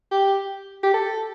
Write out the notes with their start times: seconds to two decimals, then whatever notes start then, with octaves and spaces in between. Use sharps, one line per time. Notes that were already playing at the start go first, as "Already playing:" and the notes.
0.12 G4
0.84 G4
0.94 A4